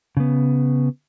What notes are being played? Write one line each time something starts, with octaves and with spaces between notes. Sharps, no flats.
C#3 B3